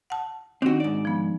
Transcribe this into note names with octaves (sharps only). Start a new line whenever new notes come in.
F#5 A5
D#3 C4 D4 D#4 F#4
G#2 D5
F3 B3